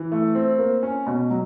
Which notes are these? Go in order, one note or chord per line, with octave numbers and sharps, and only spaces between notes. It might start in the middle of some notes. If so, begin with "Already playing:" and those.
Already playing: E3
A3
C4
A#3
C#4
B2
F#3